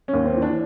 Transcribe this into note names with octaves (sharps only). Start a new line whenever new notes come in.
C#4
D#2
C4
E3
D4